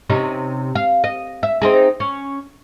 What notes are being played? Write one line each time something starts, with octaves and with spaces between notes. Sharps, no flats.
C3 C#4 D#4
F5
D#5
E5
C4 D#4 G#4
C#4